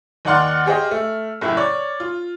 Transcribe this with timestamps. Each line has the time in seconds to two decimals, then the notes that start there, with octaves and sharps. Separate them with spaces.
0.25 D#2 D#4 D5 F#5 C6 F6
0.66 G4 G#4 C5 D#5
0.91 A3
1.41 F#1 A2 E4
1.57 C#5 D5
2.00 F4